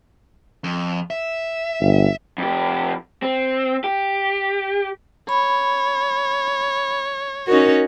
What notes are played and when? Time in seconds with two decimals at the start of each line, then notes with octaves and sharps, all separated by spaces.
0.64 F2
1.11 E5
1.81 G1
2.38 F2 G4
3.22 C4
3.84 G4
5.29 C#5 B5
7.48 C#4 D#4 F#4 A#4